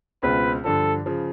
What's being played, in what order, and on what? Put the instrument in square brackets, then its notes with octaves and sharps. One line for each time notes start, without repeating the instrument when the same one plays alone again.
[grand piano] C#2 B2 G#3 C4 F4 [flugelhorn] B4
[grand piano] G2 D3 F3 [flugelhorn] A4
[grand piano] C#3 F3